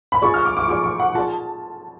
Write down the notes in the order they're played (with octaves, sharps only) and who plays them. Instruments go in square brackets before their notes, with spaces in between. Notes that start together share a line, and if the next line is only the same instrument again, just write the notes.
[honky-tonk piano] B5
[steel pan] F4 G#4 D5 [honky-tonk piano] C#6
[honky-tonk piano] F6
D6
D6
C#6
[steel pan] F4 G#4 D5 [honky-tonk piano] D6
[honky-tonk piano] C#6
F#5
[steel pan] F4 G#4 D5 [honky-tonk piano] A5